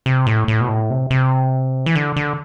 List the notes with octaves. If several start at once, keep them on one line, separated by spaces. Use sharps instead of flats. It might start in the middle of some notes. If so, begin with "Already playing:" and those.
C3
A2
A2
B2
A2
C3
C3
E3
D3
D3